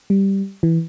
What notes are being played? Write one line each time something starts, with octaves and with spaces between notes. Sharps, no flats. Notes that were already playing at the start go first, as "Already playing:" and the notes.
G3
E3